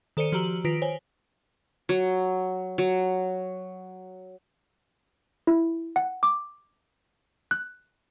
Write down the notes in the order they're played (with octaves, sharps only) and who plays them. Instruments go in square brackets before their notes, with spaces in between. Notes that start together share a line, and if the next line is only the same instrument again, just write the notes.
[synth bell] D#3 A4 C5 D5 C#7 D#7
F3 F#4 G4 A#5 E6 F#7
D#3 F4 B4 A#6 B6 D7
C5 C#5 G#5
[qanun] F#3
F#3
[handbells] E4
F#5
D6
F#6